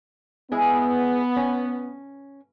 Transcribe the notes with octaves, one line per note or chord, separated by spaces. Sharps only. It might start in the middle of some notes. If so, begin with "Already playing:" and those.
G#3 B3 E4 G#4
C#4